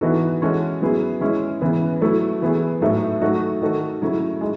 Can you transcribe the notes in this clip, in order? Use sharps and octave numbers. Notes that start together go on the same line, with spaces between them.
E3 B3 D#4 F#4 A4
E3 G#3 C#4 F#4 A4
F#3 B3 E4 G#4
G#3 C#4 E4
C#3 E3 B3
F#3 A3 E4 A4
E3 B3 E4 G#4
A2 F#3 A3 D#4
F#3 A3 D#4 F#4 A4
D#3 A3 D#4 F#4 A4
C#3 F#3 A3 E4
G#3 D#4